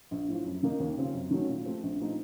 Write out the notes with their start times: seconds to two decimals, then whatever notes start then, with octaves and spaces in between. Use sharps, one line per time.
0.11 A#1
0.28 A2 F3
0.45 F#2
0.63 D#3 A#3 D#4 A#4
0.80 D#2
0.96 C#3 F3 C4
1.14 F#2
1.31 D#3 F#3 A3 C#4
1.48 A#2
1.66 F3 A3 C4
1.83 A#1
2.00 A#2 A3 C4 D#4